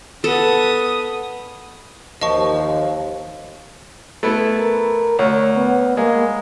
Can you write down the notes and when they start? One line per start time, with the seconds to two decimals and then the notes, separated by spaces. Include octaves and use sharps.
0.24 B3 A4 D#6
2.21 D#2 F3 D#5 A5 C#6
4.23 A3 B3 E4
4.58 A#4
5.19 D2 C#5
5.56 B3
5.97 G#3 A#3